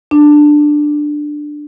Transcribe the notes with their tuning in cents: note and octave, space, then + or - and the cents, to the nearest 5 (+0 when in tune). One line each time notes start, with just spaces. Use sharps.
D4 +10